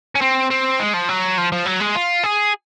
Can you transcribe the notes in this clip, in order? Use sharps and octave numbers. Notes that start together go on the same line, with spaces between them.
C#4
C4
C4
G#3
F3
F#3
F3
F3
F#3
G#3
F4
G#4